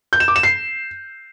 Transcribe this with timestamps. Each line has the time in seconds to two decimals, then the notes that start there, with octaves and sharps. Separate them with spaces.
0.13 G6
0.20 E7
0.28 D6
0.36 E7
0.43 C7